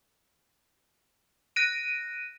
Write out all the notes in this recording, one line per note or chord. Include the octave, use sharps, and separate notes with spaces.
F#6 A#6 D7 D#7